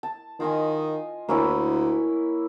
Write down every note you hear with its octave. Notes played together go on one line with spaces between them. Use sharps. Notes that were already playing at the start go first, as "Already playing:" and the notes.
A5
D#3 F4 D#5 G#5
D2 A#3 C#4 E4